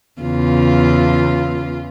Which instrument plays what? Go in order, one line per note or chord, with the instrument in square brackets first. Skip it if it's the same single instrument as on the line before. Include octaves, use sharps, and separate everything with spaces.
[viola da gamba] E2 C#3 F4